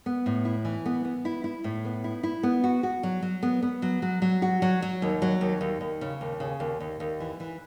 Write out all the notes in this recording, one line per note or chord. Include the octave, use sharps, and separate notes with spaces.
B3
A2
E4
E3
B3
B3
E4
E4
A2
B3
E4
E4
B3
F#4
F#4
F#3
F#3
B3
B3
F#3
F#3
F#3
F#4
F#3
F#3
D#2
F#3
D#2
D#2
D#2
C#3
D#2
C#3
D#2
D#2
D#2
E3
E3